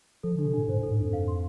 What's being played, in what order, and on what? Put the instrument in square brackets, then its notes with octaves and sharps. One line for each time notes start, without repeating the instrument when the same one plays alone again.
[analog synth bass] F3 [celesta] A4
[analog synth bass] D3 [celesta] D4
[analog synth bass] C3
[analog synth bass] A2 [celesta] D4
[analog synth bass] G#2 [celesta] C5
[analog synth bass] A2 [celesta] A4
[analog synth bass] G#2
[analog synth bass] F2 [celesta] D4
[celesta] F5
C6